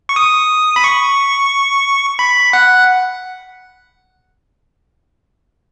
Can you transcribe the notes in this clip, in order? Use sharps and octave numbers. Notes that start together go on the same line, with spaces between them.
C#6
D#6
B5
C#6
B5
F#5